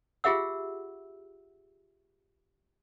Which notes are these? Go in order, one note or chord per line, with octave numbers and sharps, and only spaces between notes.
F4 G4 G#4 E5 F#5 E6